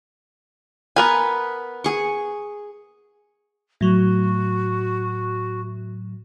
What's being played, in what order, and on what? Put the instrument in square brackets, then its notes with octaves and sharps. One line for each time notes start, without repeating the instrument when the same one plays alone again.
[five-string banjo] B3 A#4 G#5 [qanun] B4
[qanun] G#4 C#6
[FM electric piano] A2 F#3 [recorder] F#4